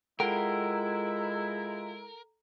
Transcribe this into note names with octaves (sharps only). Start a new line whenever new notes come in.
G#3 E4 F4 A4 A#4 F#5 G5 A#5